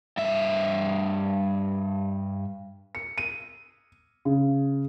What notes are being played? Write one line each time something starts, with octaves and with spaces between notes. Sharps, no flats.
G2 E5
C#7
D#7
C#3